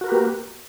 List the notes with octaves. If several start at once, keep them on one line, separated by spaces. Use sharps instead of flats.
A#3 F#4 G4 A#4 B4